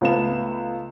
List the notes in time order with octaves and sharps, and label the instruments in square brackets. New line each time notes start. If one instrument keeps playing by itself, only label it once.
[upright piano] C#2 A3 B3 F5 E7